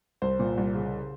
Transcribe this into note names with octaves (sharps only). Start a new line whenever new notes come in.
C2 C5
A#2
C2
C#3